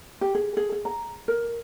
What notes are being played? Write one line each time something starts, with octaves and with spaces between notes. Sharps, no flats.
G4
G#4
G#4
G#4
A#5
A#4